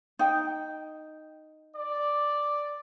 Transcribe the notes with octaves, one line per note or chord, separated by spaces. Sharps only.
D#4 G5
D5